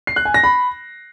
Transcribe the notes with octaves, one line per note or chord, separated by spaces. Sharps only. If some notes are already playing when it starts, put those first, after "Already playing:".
C7
F#6
G#5
A#6
B5